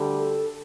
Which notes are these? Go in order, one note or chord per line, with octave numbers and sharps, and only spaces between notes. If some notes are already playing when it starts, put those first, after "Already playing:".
Already playing: D2 D3 G3
A4